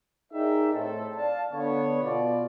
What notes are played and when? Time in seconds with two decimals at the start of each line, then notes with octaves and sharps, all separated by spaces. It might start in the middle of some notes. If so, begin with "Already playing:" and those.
0.33 D#4 G#4 A#4 D5 E5 G5
0.73 A2 C4 A4
1.14 D5 F5 A5
1.52 D3 B3 C#5
2.02 B2 F4 D5